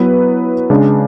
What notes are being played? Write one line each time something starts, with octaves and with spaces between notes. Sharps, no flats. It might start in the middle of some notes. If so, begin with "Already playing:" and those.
Already playing: F#3 B3 E4 B4
C#3 G#3 D4